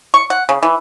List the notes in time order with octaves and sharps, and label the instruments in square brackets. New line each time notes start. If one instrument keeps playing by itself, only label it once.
[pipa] C#6
F#5
C#3
E3